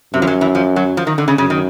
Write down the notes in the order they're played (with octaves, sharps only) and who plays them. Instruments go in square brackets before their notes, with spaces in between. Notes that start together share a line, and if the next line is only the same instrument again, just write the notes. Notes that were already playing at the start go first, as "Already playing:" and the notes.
[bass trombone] F#2 [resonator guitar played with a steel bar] C3
[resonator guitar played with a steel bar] F3
F#3
E3
F3
F#3
F3
D#3
D3
C#3
[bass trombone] F#2 [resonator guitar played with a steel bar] C#3
[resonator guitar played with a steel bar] D#3